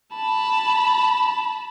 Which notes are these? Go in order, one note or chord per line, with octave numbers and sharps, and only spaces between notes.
A5 B5